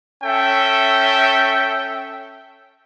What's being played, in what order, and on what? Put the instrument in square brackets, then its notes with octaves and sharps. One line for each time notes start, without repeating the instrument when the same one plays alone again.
[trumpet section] C#4 A4 E5 G5